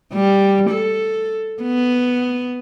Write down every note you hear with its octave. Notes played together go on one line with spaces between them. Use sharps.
G3
A4
B3